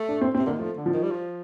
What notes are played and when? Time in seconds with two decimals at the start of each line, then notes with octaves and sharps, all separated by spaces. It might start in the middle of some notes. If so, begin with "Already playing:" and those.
Already playing: A3
0.08 D4
0.21 C4
0.35 C4
0.38 C3
0.46 D3 A#3
0.53 D#3
0.59 F3 A3
0.77 D3
0.86 F3
0.94 D#3
1.03 G3
1.11 F3